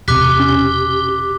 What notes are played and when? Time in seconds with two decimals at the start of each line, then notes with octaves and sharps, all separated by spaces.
0.08 E1 C3 G4 D6 F#6 B6
0.39 C#4